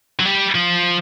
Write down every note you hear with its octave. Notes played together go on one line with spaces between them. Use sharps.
F#3
G3
F3